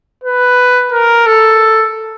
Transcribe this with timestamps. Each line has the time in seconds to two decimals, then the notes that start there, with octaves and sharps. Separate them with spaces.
0.24 B4
0.92 A#4
1.26 A4